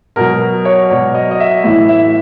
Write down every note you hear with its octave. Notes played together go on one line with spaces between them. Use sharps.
B2 F#3 A#4
C#5
B2 F#3 D5
D#5
D#5
E5
A2 E3 E5
E5